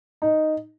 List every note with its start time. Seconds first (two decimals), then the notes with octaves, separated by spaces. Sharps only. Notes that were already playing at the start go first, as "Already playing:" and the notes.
0.22 D#4